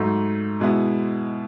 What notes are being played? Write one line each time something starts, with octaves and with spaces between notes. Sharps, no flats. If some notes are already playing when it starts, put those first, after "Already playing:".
Already playing: G#2 F#3 A3
B2 G#3 B3 E4